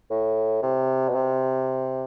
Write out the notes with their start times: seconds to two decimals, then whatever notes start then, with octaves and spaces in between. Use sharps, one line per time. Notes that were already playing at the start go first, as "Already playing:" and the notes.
0.10 A2
0.62 C3
1.09 B2
1.15 C3